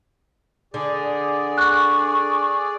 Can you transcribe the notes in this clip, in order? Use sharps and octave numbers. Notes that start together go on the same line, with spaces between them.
D3 G#4 D5
C#6 F#6